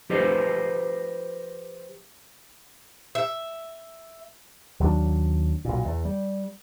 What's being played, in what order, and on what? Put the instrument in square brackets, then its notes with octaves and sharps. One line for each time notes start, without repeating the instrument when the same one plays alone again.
[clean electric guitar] F3 F4 G4 B4 C5 D#5
[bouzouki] E5
[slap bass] D#2 F#3 G3 D4
B1 A#2
E2
G3